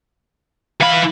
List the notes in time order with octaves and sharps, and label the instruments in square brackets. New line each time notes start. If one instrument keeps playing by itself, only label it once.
[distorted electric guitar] E3 B5 [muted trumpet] F5